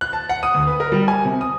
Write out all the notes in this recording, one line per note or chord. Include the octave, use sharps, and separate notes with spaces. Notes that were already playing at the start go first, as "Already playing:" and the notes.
F#6
A5
F#5
D#6
D2
B4
A#4
G3
G#5
C3
D#6